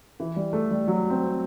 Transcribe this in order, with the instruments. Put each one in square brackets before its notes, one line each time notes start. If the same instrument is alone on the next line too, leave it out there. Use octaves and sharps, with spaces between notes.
[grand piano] E3
G3
A3
G3
F#3
C4